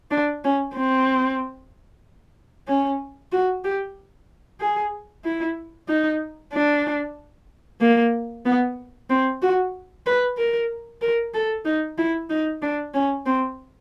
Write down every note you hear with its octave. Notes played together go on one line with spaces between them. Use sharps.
D4
C#4
C4
C#4
F#4
G4
G#4
E4
D#4
D4
A#3
B3
C4
F#4
B4
A#4
A#4
A4
D#4
E4
D#4
D4
C#4
C4